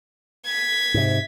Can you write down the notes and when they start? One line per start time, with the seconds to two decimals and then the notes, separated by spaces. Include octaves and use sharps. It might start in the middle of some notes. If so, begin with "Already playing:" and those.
0.46 G#6 B6
0.94 G#2 C3